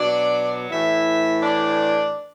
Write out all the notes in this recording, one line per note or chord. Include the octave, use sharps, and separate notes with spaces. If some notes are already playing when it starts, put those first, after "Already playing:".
Already playing: B2 F#3 D4 D5
A2 E3 E4 E5
D4 D5